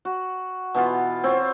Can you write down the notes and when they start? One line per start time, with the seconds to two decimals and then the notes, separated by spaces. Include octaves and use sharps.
0.05 F#4
0.75 B2 E3 B3 F4
1.24 C4 F4 C#5